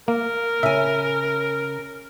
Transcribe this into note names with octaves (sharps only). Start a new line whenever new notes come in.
A#3 A#4
C#3 E5 G#5